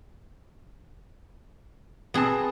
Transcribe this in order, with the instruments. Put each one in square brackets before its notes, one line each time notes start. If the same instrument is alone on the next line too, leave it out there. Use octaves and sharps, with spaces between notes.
[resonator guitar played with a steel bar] B2 C4 A5 [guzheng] B3 G#4